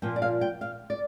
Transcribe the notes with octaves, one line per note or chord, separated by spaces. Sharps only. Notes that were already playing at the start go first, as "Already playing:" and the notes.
A#2 F3 A#3 G5
D5
F5
G5
F5
D5